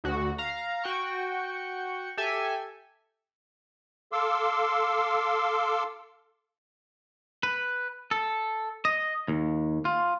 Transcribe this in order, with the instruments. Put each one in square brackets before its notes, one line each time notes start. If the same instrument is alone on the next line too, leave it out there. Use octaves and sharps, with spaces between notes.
[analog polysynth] D2 F#4
F5 A#5
F#4 G5 C#6
G4 A4 E5 G#5
[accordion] A4 F5 C6 D6 E6
[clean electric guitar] B4
A4
D#5
D#2
F4